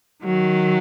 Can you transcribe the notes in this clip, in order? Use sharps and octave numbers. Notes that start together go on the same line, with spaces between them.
D#3 F#3